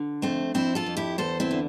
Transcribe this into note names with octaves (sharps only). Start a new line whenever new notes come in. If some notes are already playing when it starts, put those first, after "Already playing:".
Already playing: D3
F2 A3 C4
F2 C4 E4
F4 A4
F2
E4 G4
E2 A4 C5
C4 E4
D3